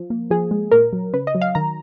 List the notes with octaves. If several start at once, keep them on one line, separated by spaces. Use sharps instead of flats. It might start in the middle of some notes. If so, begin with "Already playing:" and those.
Already playing: F3
A#3
F3 G#4
G#3
A#2 A#4
F#3
C#3 B4
D#5
F#3
F5
D#3 A#5